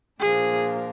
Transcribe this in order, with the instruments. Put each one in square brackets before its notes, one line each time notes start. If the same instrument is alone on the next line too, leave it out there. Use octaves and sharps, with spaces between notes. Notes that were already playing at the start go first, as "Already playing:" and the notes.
[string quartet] A#2 F3 A#3 D4 [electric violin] G#4